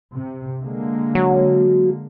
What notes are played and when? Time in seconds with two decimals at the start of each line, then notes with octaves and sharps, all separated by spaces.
0.13 C3
0.61 D3 G#3 A#3
1.15 F#3